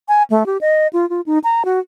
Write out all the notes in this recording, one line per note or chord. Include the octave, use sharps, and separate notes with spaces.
G#5
A3
G4
D#5
F4
F4
D#4
A#5
F#4